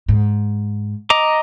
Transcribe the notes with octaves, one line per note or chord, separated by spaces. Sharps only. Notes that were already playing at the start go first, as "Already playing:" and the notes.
G#2
D#5 A#5 D6